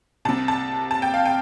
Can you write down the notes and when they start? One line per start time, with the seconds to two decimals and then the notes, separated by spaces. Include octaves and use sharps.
0.25 C2 C3 A5
0.48 A5
0.91 A5
1.02 G5
1.14 F5
1.25 G5